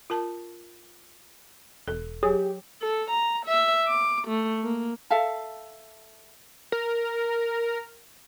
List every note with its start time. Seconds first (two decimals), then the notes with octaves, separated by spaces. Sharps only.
0.10 F4 A#4 A5
1.88 E1 A4
2.23 F#3 G4 G#4 C#5
2.82 A4
3.10 A#5
3.46 E5
3.88 D6
4.28 A3
4.64 A#3
5.10 A4 E5 F5 A5
6.72 A#4